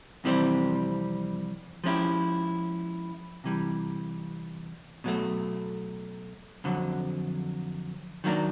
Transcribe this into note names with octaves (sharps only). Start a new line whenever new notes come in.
F2 C3 E3 G3 C4
F3 G#3 C#4 E4 G4
C3 E3 G3
B2 F#3 A3
F2 D3 F#3
D#3 F#3 A#3 D4